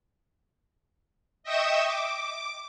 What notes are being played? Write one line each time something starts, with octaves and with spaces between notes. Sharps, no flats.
D#5 E5 G5 C#6 D#6 E6
D6